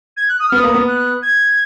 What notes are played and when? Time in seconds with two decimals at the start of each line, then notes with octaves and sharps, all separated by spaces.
0.17 G#6
0.29 F#6
0.40 D#6
0.48 F6
0.52 B3 D#6
0.64 A#3
0.74 B3
0.88 F#6
1.22 G#6